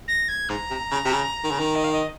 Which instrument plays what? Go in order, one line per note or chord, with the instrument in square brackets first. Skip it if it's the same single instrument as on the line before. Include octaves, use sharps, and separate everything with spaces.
[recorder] A#6
G#6
[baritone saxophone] G#2 [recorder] A#5
[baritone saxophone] C3
C#3
C3
C#3
D#3
C#3
D#3
[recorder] D#5
F5
D#5